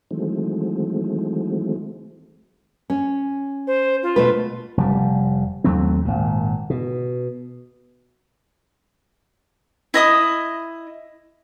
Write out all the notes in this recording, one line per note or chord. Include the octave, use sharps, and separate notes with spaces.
D#3 E3 F#3 G#3 A3 C4
C#4
C5
F4
B2 A3 B4
F1 G3
D#2 F#3 A3 C4
G#1 A#2
B2
E4 D#5 D#6